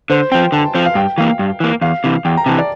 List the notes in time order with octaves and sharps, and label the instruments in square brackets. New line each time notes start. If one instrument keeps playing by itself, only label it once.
[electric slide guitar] D3 [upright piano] C5
[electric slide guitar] F3 C4 [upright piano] G5
[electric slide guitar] D3 [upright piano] A5
[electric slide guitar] F3 C4
[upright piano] F5
[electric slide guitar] G2 [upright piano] G5
[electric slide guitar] E3 A#3 [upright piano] F5
[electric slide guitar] G2
E3 A#3
[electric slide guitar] E2 [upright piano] F5
[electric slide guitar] C3 E3
[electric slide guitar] E2 [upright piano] G5
[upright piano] A#5
[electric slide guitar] C3 E3 [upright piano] A5
[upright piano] D5